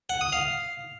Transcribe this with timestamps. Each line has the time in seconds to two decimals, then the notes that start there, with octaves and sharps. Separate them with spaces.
0.10 F#5
0.21 D#6
0.32 F5